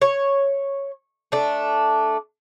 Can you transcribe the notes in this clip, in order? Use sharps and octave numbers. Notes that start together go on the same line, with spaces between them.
C#5
A3 D4